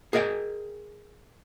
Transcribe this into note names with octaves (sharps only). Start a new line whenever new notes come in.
G#4 A#4 D#5 F5 G5